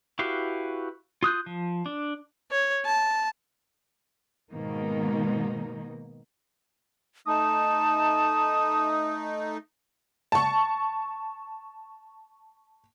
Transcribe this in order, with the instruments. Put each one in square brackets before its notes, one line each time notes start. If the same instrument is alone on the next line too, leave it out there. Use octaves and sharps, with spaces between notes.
[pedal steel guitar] E4 F#4 G4 B4 F5
F4 D#6 F#6 G6
F3
D4
[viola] C#5
A5
[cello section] G#2 B2 D#3 A#3 D#4
[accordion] A3 D#4 [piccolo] A5 [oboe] D#6
[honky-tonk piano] A5 C#6